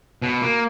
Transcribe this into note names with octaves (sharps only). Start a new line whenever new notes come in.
B2
A#3